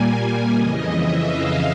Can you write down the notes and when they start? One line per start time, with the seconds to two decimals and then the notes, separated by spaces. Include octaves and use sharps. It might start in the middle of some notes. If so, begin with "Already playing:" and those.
Already playing: A#2 G3 A#3 G#5
0.53 F2 C#3 E3 D#5
0.88 E5
1.23 F5